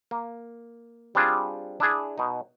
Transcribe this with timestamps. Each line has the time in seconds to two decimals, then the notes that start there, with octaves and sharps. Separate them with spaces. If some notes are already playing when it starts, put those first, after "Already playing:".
0.11 A#3
1.15 G3 C4 D4 F4 G#4
1.80 D4 E4 G#4
2.18 B2 D#4